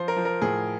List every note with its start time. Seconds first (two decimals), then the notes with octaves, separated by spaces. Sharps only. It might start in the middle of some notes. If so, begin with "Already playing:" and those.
Already playing: F3 C5
0.08 A#4
0.16 F3
0.25 A#4
0.42 A2 G#4